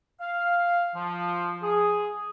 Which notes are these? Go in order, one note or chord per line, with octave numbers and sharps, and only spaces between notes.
F5
F3
G#4